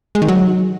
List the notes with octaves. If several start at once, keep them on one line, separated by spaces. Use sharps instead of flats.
G#3
D#3
F#3